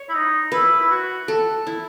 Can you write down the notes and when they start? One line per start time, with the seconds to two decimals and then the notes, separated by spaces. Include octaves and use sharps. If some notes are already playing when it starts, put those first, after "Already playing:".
Already playing: C#5
0.09 E4
0.14 D#4
0.52 E4 B4
0.79 E4
0.91 F#4
1.28 A4
1.67 E4